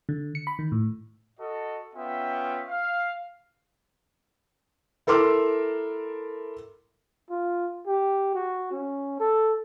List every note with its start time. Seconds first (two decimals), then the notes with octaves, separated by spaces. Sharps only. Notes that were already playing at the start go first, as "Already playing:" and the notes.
0.09 D3
0.35 C#7
0.47 B5
0.59 D#3
0.72 A2
1.39 F#4 A4 D#5
1.95 B3 C#4 F4 E5 G5
2.69 F5
5.07 E4 A4 A#4 C6 D6 E6
7.30 F4
7.87 G4
8.35 F#4
8.72 C#4
9.20 A4